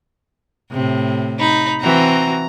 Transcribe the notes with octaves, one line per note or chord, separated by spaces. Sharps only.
A2 C3
D#4 B5
E3 C4 F#4 A#5